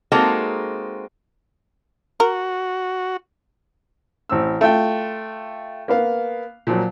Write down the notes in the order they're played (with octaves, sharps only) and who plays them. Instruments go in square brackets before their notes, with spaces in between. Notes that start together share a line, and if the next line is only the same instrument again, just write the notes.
[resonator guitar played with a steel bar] G#3 A#3 C4 D#4 F#4 A4
[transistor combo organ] F#4 [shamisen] A#4
[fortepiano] A1 C4 E6
A3 F4 G5
A#3 B3 F5
A#2 F3 F#3